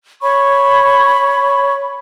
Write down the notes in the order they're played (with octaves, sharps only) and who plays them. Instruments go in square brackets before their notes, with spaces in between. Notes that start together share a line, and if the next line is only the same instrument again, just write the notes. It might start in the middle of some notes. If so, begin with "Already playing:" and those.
[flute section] C#5 B5 C#6